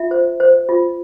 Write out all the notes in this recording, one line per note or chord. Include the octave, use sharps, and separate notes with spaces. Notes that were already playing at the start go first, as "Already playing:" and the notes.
Already playing: F4 E5
C5
C5
F4